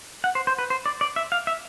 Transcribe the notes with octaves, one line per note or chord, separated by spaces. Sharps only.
F#5
C5
C5
B4
C5
D5
D5
E5
F5
E5